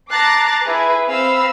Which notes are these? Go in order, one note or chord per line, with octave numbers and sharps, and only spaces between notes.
A5 A#5 D6 F#6 A6 C7
E4 G#4 B4
C4 F5 B5 E6